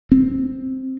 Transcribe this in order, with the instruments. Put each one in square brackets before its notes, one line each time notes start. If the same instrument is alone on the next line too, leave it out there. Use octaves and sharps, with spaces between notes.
[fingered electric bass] C4